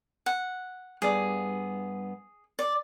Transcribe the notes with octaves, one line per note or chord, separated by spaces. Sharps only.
F#5
G2 B3 G#4 D5
D5